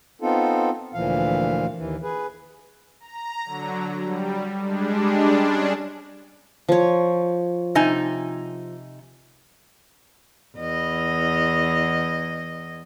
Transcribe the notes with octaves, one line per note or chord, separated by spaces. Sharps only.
B3 C4 D#4 F4 A4
D2 A#2 E3 F3 F5
D#2 E3
G#4 B4
A#5
D3 F#3
G3
G3 G#3 D4
C#4 D4 G#4
F3 C#5
C3 D#4 G#5
E2 D#5